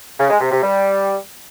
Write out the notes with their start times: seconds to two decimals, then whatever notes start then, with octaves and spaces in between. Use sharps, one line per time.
0.19 C#3
0.30 G#3
0.41 C3
0.51 C3
0.62 G3